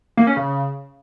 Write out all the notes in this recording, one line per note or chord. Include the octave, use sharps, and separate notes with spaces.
A#3
C#4
C#3